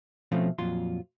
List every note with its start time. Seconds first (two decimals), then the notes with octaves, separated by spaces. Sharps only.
0.32 B2 F3 A3 C4 C#4 F4
0.58 F2 A#2 F#3 F4 C6